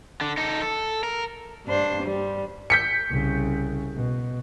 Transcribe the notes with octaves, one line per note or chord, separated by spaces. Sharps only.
D3
D#4 A4
A4
A#4
G2 D4 C5
G3
G6 B6 C#7
C2 C#3
B2